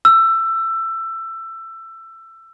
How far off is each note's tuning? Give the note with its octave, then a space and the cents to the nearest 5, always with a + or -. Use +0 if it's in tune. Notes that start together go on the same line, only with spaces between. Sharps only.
E6 +20